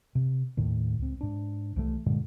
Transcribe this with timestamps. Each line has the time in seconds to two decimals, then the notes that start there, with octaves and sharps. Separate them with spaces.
0.15 C3
0.57 D#2 A2 D#3
0.99 C#2 C4
1.21 G#2 D4
1.76 C2 E3 F3 A3
2.06 G2 A#2 D3 G#3